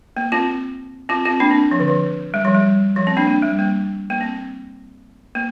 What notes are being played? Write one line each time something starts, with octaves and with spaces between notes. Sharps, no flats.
A#3
C4 F4
C4 F4
C4 F4
A#3 D4
C4
F3
D3
F3
G3
F3
G3
F3
C4
A#3 D4
A#3
G3
A#3
A#3
C4
A#3